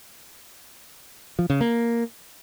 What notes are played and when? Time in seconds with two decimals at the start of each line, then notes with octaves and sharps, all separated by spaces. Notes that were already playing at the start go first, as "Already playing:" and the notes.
1.39 F3
1.50 C#3
1.61 A#3